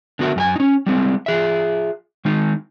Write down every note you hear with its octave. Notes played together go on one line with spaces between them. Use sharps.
D3 B3 F#4 A#4 E5
F#2 G4 G#5
C#4 D#4
G3 G#3 C4
F4 G#4 E5
D#3 G#3 D#4